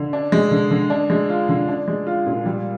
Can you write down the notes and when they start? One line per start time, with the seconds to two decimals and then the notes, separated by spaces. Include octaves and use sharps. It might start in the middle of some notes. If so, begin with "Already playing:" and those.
Already playing: D3
0.13 D4
0.32 G#3
0.51 D3
0.71 D3
0.90 D4
1.10 G#3
1.29 F4
1.49 D3
1.68 D4
1.88 G#3
2.07 F4
2.26 A#2
2.46 G3